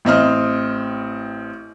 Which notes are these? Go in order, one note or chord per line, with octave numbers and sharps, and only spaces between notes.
A1 C4 D#5 F6